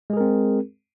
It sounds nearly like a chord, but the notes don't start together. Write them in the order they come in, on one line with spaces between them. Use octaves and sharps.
G#3 G#4 A#4 C4